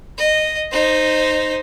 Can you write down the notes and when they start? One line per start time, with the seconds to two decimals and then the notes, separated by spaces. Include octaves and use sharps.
0.18 D#5
0.72 D#4 C5